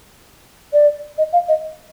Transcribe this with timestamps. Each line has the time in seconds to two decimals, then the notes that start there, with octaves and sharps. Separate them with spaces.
0.73 D5
1.18 D#5
1.33 F5
1.48 D#5